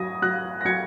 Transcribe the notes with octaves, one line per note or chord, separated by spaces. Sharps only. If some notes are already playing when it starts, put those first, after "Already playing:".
Already playing: F#3 D#6 G#6 A#6
F#3 F#6 A#6
A#6
F#3 G#6 C#7